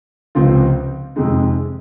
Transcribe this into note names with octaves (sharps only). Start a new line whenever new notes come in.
C#2 C3 F3 C4 F4
F2 C3 D#3 G#3 D#4